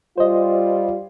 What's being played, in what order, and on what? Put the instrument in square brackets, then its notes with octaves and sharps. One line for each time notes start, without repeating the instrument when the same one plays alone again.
[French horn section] G3 F4 [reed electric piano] C5 D#5